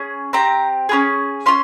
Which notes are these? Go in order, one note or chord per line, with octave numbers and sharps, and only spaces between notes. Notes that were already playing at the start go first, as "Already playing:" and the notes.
Already playing: C#4 G#4
C4 G4 A#5
C#4 F4 G#4
C#4 F4 C6